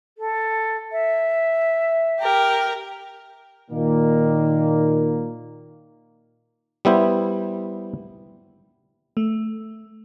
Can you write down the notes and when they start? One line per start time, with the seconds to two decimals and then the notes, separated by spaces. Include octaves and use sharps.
0.18 A4
0.92 E5
2.20 G4 A#4
3.71 A#2 D#3 A#3
6.85 G3 B3 E4 C5
9.17 A3